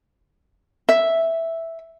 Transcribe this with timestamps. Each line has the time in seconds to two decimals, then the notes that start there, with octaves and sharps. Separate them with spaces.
0.89 E5